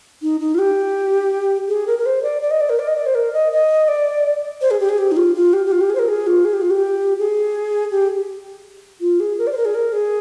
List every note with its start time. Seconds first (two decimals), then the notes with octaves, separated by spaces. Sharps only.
0.22 D#4
0.40 D#4
0.54 F4
0.58 G4
1.68 G#4
1.86 A#4
1.98 A#4
2.05 C5
2.22 D5
2.41 D5
2.50 D#5
2.60 D5
2.69 A#4
2.79 D5
2.87 D#5
2.96 D5
3.06 C5
3.14 A#4
3.32 D#5
3.52 D#5
3.88 D5
4.61 C5
4.70 G#4
4.79 G4
4.89 G#4
4.97 G4
5.11 D#4
5.16 F4
5.35 F4
5.53 G4
5.65 G4
5.71 F4
5.80 G4
5.89 G#4
5.95 C5
5.98 A#4
6.08 G#4
6.26 F4
6.44 G#4
6.53 G4
6.61 F4
6.70 G4
7.18 G#4
7.91 G4
9.00 F4
9.19 G#4
9.38 A#4
9.46 D5
9.51 C5
9.56 A#4
9.65 G#4
9.74 A#4
9.92 G#4